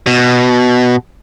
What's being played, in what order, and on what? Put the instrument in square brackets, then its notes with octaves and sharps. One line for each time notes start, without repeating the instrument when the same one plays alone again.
[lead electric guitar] B2